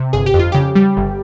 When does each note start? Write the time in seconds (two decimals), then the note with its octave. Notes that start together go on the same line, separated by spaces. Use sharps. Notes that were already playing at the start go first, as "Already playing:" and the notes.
Already playing: C3
0.13 G1 G#4
0.26 G4
0.34 F2
0.39 F4
0.52 C#3 G4
0.75 G3
0.97 G1